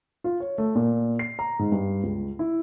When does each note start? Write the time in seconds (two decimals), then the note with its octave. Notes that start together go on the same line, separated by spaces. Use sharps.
0.24 F4
0.40 C#5
0.58 A3
0.75 A#2
1.19 C7
1.39 A#5
1.59 G#2
1.72 G2
2.03 C#2
2.39 E4